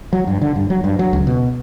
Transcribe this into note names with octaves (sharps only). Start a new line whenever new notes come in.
F#3
G2
D3
G2
F#3
G2
F#3
C#2
B2